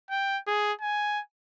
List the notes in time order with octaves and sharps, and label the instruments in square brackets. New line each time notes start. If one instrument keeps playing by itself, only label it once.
[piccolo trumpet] G5
G#4
G#5